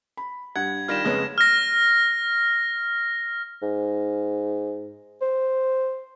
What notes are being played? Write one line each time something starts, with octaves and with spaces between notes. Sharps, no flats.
B5
G2 F#5 G#6
D#3 G3 F4 F6 A#6 E7
F2 C#3 G#3 C#4 B4
F6 A#6
G#2
C5